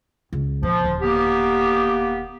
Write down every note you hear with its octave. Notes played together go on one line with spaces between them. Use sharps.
C#2
A#2 F3
D#1 D3
A#3 B3 G4